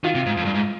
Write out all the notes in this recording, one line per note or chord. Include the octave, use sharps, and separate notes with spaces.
D#3 F4
C3
G#2
F2
G2
G#2